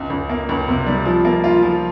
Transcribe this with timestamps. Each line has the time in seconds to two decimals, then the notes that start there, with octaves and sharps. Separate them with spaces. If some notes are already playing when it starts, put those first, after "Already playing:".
Already playing: C#2
0.10 C#2
0.29 A#3
0.49 C#2
0.68 C3
0.86 G3
1.05 F3
1.25 A#3
1.44 F4
1.62 F3